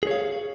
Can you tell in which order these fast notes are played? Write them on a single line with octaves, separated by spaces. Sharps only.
G#4 C#5 F5